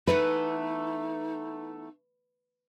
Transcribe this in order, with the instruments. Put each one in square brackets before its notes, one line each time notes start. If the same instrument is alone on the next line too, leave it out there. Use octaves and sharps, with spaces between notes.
[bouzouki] E3 A3 B3 [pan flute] D#4 [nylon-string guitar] B4